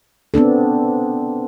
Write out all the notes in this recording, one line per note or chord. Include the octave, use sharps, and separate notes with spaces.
B3 C4 D4 A4